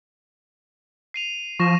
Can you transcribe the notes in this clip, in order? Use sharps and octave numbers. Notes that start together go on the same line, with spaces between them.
C7 D#7 F7
F3 C#6 A#6 E7